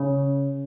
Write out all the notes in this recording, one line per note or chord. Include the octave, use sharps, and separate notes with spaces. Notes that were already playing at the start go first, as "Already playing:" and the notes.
Already playing: C#3